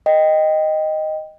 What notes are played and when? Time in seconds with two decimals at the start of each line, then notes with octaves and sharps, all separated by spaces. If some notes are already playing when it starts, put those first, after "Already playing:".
0.06 D#5 G5